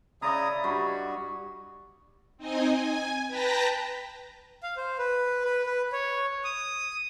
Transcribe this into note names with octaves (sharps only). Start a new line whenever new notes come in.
C#3 E4 D5 D#5 A#5 D#6
G2 F#4
C4 D#4 D#5 G#5
G#5
B4 G5 A5 A#5 A#6 B6
F5
C5
B4
B4
B4
C#5
D#6